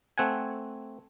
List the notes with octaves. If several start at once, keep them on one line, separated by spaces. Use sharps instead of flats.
A3 C4 F#5 G#5